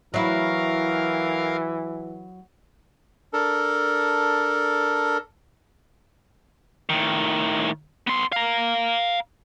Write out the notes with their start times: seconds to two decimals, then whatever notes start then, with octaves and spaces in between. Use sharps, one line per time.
0.14 E3 F#3 E4 A#4 F5
3.33 D4 A4 A#4
6.89 A2 D#3
8.07 B3 C6
8.32 F5 A#5